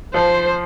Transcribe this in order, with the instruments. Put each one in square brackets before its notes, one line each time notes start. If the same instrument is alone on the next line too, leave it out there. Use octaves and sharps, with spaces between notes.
[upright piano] F3 [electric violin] C5